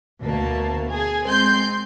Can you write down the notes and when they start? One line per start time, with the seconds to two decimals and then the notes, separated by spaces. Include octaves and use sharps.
0.23 D2 B2 A#3 A5
0.87 G#4
1.25 G#3 C4 C6 G6